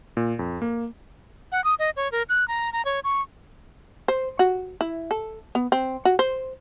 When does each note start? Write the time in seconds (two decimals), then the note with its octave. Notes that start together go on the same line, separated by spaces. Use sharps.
0.17 A#2
0.39 F2
0.62 A#3
1.52 F#5
1.64 D#6
1.79 D#5
1.96 C#5
2.12 A#4
2.29 F#6
2.48 A#5
2.73 A#5
2.85 C#5
3.04 C#6
4.08 C5
4.39 F#4
4.81 E4
5.11 A4
5.55 B3
5.72 C4
6.05 F#4
6.19 C5